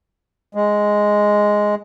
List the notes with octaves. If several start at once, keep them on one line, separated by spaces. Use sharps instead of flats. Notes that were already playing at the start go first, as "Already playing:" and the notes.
G#3